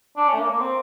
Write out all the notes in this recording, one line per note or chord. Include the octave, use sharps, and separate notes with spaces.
D4
C#4
A3
A#3
A#3
C4